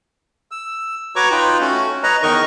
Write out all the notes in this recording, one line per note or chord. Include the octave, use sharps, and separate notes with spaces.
E6
F#4 B4 C#5 A#5 C#6 D6
D#4 F4 B4 G5
A3 C#4 F#4
B4 C#5 D#5 A#5
E2 D#3 D#4 A#4 D#5 C#6